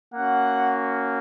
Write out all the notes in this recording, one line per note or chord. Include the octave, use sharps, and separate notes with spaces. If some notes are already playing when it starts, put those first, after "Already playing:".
A#3 C#4 F#4 F#5